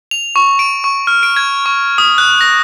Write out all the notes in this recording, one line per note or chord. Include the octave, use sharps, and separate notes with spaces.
F7
C#6
D7
C#6
F6
D7
G#6
C#6
D#6
F#6
A#6